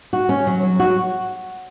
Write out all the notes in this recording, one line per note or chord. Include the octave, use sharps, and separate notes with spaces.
F#4
C#4
F#3
F#3
F#4